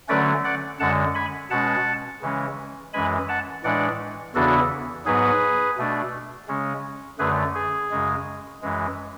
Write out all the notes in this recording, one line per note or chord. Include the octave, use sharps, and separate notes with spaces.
D3 F#3 A3 C#4 B4 D5
D5 F#5
F#2 D3 G#3 F#5 A5
G#5 B5
B2 G#3 C#4 F#5 A5
C#3 E3 G#3 C#4
F#2 E3 G#3 G#5 B5
F#5 A5
A2 E3 G#3 D4 D5 F#5
E2 C#3 E3 B3 D4 F#4 A4
G#2 F#3 B3 G#4 B4
B2 A3 D4
C#3 G#3 C#4
F#2 D3 A3 G#4 B4
G#4
F#2 C#3 G#3
F#2 E3 G#3